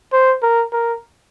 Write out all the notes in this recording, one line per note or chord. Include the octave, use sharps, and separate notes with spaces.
C5
A#4
A#4